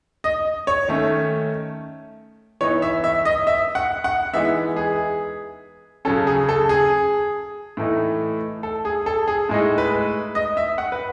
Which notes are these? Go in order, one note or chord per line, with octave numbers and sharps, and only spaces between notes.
D#5
C#5
D#3 A3 C#4
E3 B3 D#4 C#5
E5
E5
D#5
E5
F#5
F#5
E3 G#3 B3 D#4 E5
G#4
C#3 F#3 C#4 A4
G#4
A4
G#4
A2 E3 A3 D#4
A4
G#4
A4
G#4
A2 G#3 D#4
B4
D#5
E5
F#5
B4